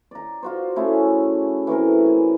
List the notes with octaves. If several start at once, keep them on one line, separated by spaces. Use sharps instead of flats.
D5 A#5
F4 F#4 C5
A3 C#4 E4 G#4
E3 A3 C4 A#4
G#5